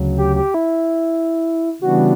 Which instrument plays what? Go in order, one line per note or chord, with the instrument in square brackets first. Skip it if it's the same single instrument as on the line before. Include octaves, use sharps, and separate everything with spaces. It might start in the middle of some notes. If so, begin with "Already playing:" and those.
Already playing: [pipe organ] D2 C#3 F#3
[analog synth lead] G4
G4
E4
[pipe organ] C#3 E3 G3 B3 D4 [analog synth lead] F#4